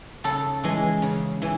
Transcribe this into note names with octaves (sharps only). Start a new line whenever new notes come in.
C#3 A4
E3 G#3
C#3
E3